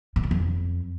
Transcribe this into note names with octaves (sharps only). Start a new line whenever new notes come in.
A2
E2
F2